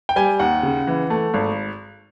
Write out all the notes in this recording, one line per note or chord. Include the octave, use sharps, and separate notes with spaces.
G5
G3 G#5
D#2 F#5
C#3
E3
A3
G#1